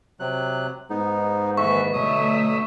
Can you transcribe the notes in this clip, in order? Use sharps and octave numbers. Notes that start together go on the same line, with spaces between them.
C3 F#3 F#6
G#2 B3 D#4
D#3 E3 A#3 A4 B4 E5 C#6
B2 D3 F#3 A3 E5 D#6